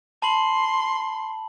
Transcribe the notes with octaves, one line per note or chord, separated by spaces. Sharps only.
A5 B5 C6 F#7